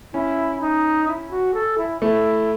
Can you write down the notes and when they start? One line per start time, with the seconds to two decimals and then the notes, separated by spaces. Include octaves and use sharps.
0.13 C#4 E4
0.61 D#4
1.08 E4
1.31 F#4
1.54 A4
1.78 E4
2.02 A3 E4